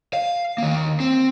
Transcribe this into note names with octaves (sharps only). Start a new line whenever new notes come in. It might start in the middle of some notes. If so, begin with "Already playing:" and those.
F5
D#3 A#3
C4